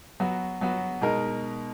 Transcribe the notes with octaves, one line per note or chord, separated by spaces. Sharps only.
F#3 B3 F#4
F#3 B3 F#4
B2 G#3 D#4 A#4